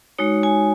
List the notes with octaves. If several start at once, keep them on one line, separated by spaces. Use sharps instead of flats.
G#3 D#4 F#4 C#5
G#5